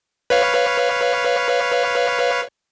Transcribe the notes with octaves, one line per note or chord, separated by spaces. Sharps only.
B4 C#5 F5